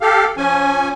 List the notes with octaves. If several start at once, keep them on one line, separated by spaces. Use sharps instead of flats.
G4 A4 F5
F3 C#4 G#5